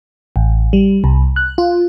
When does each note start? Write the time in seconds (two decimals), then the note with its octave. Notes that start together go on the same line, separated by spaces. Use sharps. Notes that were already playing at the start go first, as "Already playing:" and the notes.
0.36 A1
0.73 G3
1.04 C2
1.36 F#6
1.58 F4